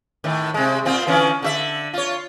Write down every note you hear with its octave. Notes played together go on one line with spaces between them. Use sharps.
A2 D#3
C3 G#3
A#2 C4 F4
D3 E3 C#4
D3 F#4 E5
F4 C#5